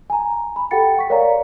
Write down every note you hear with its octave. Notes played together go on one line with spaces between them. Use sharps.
G#5 A#5
B5
G4 A4 F#5 G5 A6 C#7
F#5 C#6 B6
A#4 C#5 D5 F5 F#5 A#5